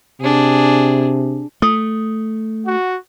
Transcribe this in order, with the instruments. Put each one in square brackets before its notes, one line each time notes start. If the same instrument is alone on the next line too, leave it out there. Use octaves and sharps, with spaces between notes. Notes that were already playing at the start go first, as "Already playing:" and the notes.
[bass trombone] C3 [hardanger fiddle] D4 G#4
[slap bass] A3 [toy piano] D#6
[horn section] F#4